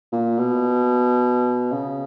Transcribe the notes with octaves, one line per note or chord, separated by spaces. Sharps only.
A#2
B2
C#3